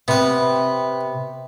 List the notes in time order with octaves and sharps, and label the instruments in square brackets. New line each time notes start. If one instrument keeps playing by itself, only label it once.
[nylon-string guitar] C3 [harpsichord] B3 B4